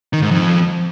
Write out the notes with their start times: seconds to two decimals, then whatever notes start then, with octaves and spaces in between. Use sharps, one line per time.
0.13 D#3
0.22 G#2
0.31 F2